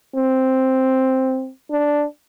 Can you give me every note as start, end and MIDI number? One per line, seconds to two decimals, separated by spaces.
0.16 1.50 60
1.71 2.05 62